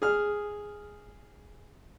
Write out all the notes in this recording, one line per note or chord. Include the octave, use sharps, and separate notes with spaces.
G#4 F6